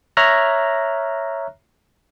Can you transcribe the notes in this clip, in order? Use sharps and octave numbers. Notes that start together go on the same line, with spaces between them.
C#5 E5 A#5 F6 F#6 A#6